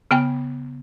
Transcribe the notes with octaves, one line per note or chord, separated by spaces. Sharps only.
C#3 B3 G5 G#5